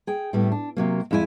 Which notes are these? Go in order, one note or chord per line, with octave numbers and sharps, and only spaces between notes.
G#4 G5
A2 G3 A3 B3
D4
C3 F#3 A#3
F2 G#3 E4 F4 G#5